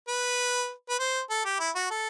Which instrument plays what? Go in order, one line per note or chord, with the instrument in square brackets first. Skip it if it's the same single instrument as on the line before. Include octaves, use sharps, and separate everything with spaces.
[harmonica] B4
B4
C5
A4
G4
E4
F#4
A4